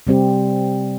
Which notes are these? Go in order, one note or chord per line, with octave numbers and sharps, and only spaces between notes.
C3 G3 C4 G4